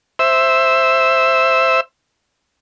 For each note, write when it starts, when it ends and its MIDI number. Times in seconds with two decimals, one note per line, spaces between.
0.19 1.80 72
0.19 1.80 76
0.19 1.80 88